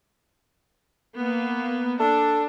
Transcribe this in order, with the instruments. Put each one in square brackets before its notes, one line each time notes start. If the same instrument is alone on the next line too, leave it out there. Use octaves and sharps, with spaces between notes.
[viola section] A#3 B3
[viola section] D4 [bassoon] A4